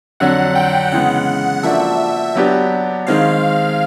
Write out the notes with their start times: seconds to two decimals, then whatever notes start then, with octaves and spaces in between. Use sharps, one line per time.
0.20 F2 D3 F#3 F#5
0.55 G5
0.92 C#3 E3 G#3 B3 F#5
1.63 F3 A#3 D4 F#4 A4 E5
2.35 F#3 B3 D4 G4
3.07 D#3 G#3 C4 F5